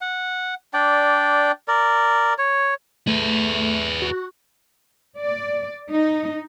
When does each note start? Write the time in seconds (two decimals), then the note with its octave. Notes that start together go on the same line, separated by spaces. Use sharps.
0.01 F#5
0.74 D4 D5 G5
1.68 A#4 D5
2.38 C#5
3.07 A3 G#4 B4
4.02 F#4
5.18 D5
5.91 D#4